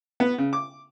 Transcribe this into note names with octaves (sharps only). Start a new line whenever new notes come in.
B3
C#3
D6